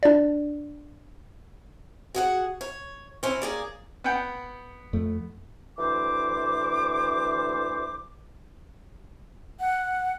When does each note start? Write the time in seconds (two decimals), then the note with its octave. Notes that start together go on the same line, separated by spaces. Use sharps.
0.03 D4 D5
2.15 F#4 G#4 F#5
2.61 C#5
3.23 C4 C#4 E4
3.42 A#3 G#4 D5
4.04 B3 F#5 G5
4.93 F2 A3
5.78 D2 E3 C5 D6
9.60 F#5